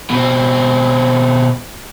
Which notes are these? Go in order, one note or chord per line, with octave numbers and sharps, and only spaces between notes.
B2 C4